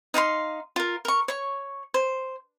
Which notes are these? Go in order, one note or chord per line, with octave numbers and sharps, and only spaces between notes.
D#4 F5 G5 C6
F4 A#4
A#4 C#6
C#5 C#6
C5